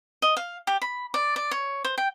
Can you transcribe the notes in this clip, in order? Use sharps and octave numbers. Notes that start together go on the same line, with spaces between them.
D#5
F5
G4
B5
D5
D5
C#5
C5
G5